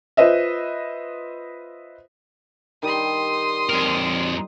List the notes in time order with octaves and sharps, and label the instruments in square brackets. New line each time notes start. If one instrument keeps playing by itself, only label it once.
[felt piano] F4 B4 C5 D#5 E5
[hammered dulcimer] D#3 G3 [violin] C6 D#6
[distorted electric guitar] F2 A#4